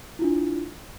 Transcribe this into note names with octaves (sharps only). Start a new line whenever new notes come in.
D4 E4 F4